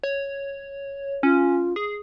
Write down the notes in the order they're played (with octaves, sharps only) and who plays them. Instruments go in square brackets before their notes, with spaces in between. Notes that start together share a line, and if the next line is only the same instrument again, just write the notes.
[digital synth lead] C#5
[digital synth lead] C#4 [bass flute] F4
[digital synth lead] G#4